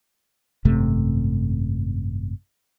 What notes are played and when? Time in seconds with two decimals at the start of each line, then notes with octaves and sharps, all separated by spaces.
0.65 G#1 F#2 C3 A3